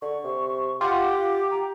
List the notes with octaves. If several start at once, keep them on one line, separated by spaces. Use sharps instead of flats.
D3 C#6
C3
F4 G4 F#5 D6
A#5